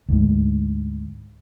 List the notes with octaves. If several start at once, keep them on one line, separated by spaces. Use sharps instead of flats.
D2 G#2